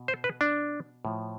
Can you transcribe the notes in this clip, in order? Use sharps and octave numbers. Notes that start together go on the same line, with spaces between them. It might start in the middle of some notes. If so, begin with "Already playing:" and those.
Already playing: B2
C5
B4
D4
A2 F3